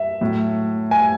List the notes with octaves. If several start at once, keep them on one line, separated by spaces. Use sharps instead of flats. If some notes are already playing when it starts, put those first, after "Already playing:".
Already playing: E5
A2 F#3 A3
G#5